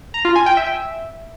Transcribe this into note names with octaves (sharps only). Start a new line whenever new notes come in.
A#5
F4
G#5
G5
E5